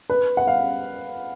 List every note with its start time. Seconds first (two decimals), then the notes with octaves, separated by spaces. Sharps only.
0.10 B4
0.37 F#5
0.47 F5